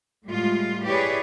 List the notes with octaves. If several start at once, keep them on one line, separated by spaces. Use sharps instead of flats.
A2 G3 G#3 F4
E4 G4 G#4 B4 C#5 D5